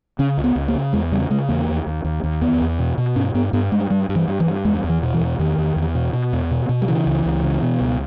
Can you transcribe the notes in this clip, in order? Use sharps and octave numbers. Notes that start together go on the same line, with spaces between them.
C#3 C#4
C#2
B3
C#2
A#3
C#3
E2 G#3
C#3 G3
C#3 G#3
E2 A#3
D#2
D#2
D#2
D#2
E2 B3
E2
B2
B2
G2 C#4
G2 B3
G2 B3
G2 G#3
G2 G3
G2
E3
G2
E3
G2
E2 G#3
E2
E3
B2
E3
E2
E2 D#3
E2
E2
B2
B2
E2
B2
B2
G3
C#3 E3
C#2
C#2
C#3
B2
C#2